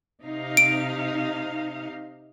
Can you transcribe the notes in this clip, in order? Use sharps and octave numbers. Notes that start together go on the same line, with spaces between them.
C3 D#4 F5
D7